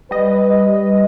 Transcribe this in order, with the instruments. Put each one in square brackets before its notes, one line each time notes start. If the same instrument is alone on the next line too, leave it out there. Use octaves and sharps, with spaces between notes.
[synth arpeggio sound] G3 D#5 [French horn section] B4